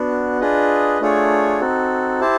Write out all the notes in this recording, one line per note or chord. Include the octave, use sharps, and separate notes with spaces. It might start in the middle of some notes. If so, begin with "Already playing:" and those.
Already playing: B3 D4 F#4
D4 F4 G#4 B4 D#5
A3 D4 F4 G#4 C#5
C4 D#4 F#4 A4
E4 G4 C5 E5 A5